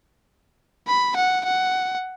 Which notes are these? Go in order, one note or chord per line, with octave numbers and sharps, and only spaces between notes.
B5
F#5
F#5